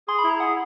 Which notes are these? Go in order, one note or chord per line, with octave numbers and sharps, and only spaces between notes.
G#4 C6
B5
E4
A#5
G#4 F#5